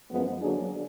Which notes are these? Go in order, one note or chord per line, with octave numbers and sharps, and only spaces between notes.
F#2 F3 G#3 B3
D3 F#3 A#3 D4 G#4